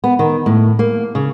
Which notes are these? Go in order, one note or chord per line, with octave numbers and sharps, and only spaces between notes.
B3
D#3
A2
A#3
C#3